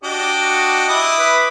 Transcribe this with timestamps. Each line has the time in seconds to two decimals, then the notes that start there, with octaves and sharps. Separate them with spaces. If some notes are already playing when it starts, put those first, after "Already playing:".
0.04 D4 F#4 G4 D#5
0.41 F#4
0.88 E4 D6 D#6
1.19 B4